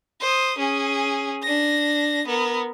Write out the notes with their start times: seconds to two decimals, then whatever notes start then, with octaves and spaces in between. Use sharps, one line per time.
0.20 C5 D#6
0.58 C#4 G#4
1.43 D4 A#6
2.27 B3 A#4